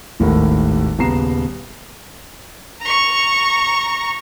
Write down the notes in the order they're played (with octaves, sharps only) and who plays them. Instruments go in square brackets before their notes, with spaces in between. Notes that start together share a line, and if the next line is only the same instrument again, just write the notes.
[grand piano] D#1 G#1 D#2 A2 A#4
D#1 C#3 B3 A#5 C7 E7
[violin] A#5 C#6